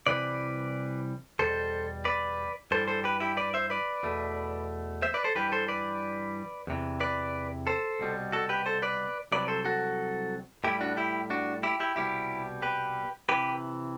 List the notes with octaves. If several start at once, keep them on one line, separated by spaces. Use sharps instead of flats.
C2 C3 E3 G3 B4 D5
E2 B2 G3 A4 C5
B4 D5
G2 E3 G3 A4 C5
A4 C5
G4 B4
E4 G4
B4 D5
C5 E5
B4 D5
E2 B2 A3
C5 E5
B4 D5
A4 C5
G2 E3 G3 G4 B4
A4 C5
B4 D5
E2 C3 E3
B4 D5
A4 C5
C2 B2 G3
F#4 A4
G4 B4
A4 C5
B4 D5
C2 C3 F#3 B4 D5
A4 C5
F#4 A4
A2 G3 E4 G4
D4 F#4
E4 G4
D4 F#4
E4 G4
E4 G4
C2 B2 G3 E4 G4
G4 B4
C3 E3 G4 B4